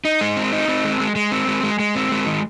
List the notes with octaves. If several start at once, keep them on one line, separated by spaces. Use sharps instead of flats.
D#4
G#3
C4
D#4
C4
G#3
G#3
G#3
C4
G#3
G#3
G#3
C4
G#3
D#3